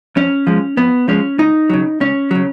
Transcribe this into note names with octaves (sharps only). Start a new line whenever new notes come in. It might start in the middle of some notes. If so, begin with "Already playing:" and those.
F2 C#4
F3 G#3
F2 B3
F3 G#3 C#4
C#2 D#4
C#3 F#3
C#2 C#4
C#3 F#3